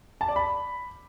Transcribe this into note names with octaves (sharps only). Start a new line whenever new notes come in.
A5
D5
B5